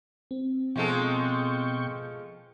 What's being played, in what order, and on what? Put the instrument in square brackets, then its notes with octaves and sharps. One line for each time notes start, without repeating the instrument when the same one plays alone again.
[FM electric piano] C4
[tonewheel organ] B2 G5 C#6 [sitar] F3 G#3 A4